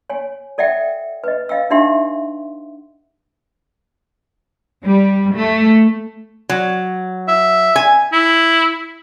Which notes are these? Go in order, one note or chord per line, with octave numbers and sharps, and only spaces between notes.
C#5 G#5
A4 D5 E5 F#5 G5
B4 D#5
D#5 F5 G5 E6
D4 D#4 G4 E5 F#5 C6
G3
A3
F#3
E5
G#5
E4